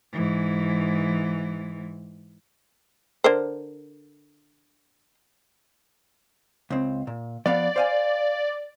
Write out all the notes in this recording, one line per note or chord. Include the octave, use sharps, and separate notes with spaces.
G#2 E3
D3 A#4 C5
C#2 C4
A#2
F3 B3 D5 F5
C5 F5 G#5